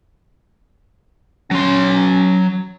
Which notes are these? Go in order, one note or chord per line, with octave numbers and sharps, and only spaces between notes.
F#3 C#4 C6